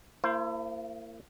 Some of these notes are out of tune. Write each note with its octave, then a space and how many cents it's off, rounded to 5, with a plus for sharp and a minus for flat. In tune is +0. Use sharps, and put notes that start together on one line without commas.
A#3 -30 E4 +30 C5 +0